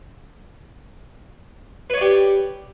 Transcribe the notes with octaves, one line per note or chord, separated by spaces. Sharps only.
G4 B4 C#5 D5